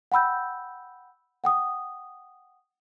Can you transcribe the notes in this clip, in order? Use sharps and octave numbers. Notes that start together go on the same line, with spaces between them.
F#5 G5 B5 E6 G6
F#5 G5 D#6